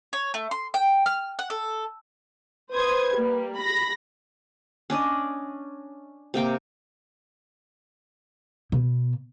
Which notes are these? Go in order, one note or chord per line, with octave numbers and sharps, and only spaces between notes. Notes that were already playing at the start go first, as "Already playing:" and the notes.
C#5
A3
C6
G5
F6
F#5
A4
B4 C5 D#6 G#6
G3 A#3
B5 A#6
C#4 D4 D5 D#5
C3 A#3 G5 D6
B2